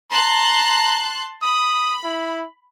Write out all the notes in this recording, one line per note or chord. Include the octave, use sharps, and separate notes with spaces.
A5 A#5 C6 F#6
B5 D#6
E4